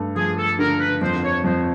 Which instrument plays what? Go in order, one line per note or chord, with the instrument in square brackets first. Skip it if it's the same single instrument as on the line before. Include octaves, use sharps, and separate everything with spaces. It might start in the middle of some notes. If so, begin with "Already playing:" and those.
Already playing: [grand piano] G2 A3
[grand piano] F3 [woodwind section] G#4
[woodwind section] A4
[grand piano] D3 [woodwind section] A#4
[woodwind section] B4
[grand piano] F2 [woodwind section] C5
[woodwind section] C#5
[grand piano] F2 [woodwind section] C5